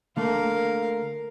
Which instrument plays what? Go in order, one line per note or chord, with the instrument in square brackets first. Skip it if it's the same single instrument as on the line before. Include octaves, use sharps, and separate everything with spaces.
[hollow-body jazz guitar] D3 A3 A#3 [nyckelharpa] A#4 F5